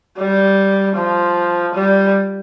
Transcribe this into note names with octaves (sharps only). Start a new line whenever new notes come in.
G3
F3
G3